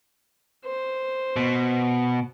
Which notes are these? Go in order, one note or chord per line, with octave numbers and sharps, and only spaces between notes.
C5
B2